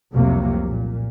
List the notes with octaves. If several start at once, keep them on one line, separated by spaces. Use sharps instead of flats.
F1 C2 C3 F#3 A#3
A#2